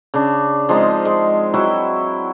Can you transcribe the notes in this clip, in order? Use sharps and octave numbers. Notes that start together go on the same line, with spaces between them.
C#3 D4
F3 G#3 C4 D#4
G#3
F#3 E4 F#4 G5